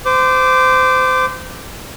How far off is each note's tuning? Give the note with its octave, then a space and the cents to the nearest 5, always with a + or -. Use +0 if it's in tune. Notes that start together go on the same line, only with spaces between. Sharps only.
C5 -30 D6 +0